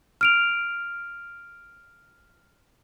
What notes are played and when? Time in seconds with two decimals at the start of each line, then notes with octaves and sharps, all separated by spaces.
0.21 F6 D7 F7